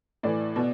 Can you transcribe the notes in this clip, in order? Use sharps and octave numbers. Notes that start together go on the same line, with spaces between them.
A2 E3 D5
B2